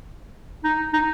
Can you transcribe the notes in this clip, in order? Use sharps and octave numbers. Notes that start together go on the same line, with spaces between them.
D#4
D#4